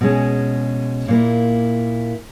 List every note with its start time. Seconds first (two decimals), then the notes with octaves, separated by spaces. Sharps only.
0.01 B2 G#3 C#4
1.08 A#2 A#3 E4